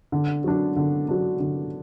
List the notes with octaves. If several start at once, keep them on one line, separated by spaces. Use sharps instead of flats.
D3
F#3 D4
D3
F#3 D4
D3